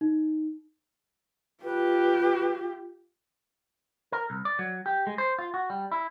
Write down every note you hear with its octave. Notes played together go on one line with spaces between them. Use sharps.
D#4
F4 G4 B4
A#4
C2
D5
F#3
G4
G#3
C5
F4
F#4
G3
E4